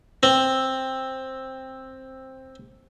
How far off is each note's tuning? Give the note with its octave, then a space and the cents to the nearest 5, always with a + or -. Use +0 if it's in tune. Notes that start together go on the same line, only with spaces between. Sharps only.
C4 +10